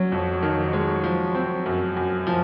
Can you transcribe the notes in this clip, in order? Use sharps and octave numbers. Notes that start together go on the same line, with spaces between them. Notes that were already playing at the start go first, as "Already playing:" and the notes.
Already playing: F#3 C#4
F2
D#3
G#3
F3
C4
F#2
F#2
F3